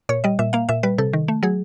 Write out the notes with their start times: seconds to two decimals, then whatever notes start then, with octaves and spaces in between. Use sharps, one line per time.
0.09 A#2 C#5
0.24 G3 D#5
0.39 A#2 E5
0.53 A#3 F5
0.69 A#2 E5
0.83 G3 B4
0.98 C3 A4
1.13 D#3
1.28 A3
1.43 F#3 G#4